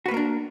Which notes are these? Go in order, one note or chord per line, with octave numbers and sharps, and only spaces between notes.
A#3 D4 F#4 A#4 B4